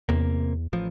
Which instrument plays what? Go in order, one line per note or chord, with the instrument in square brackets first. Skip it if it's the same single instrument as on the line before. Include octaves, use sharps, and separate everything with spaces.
[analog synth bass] E2 [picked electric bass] C3 A#3
[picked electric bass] A1 F3